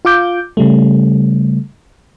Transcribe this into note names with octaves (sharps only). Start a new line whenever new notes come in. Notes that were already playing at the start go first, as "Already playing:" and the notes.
F4 F5 D6 G6
C#3 G3 A3